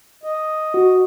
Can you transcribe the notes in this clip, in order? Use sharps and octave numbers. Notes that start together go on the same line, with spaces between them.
D#5
F#4